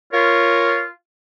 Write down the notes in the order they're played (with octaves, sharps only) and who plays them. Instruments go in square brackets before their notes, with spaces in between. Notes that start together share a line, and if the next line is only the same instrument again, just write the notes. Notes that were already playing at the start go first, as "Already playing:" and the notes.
[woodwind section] F4 [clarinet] A#4 [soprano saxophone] C#5